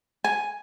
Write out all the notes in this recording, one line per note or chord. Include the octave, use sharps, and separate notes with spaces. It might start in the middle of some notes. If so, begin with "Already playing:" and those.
G#5